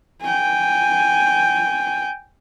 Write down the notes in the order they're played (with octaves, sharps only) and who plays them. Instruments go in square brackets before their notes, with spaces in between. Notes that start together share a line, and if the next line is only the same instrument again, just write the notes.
[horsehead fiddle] G5 G#5